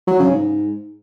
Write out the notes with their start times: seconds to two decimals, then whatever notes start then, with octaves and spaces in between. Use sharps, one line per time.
0.08 F#3
0.19 C#3
0.31 G#2